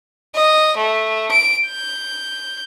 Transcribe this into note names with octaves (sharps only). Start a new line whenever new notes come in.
D#5
A3
D7
G6